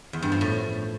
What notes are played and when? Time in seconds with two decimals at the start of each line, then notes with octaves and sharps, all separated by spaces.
0.13 E2
0.22 G2
0.32 F3
0.41 A2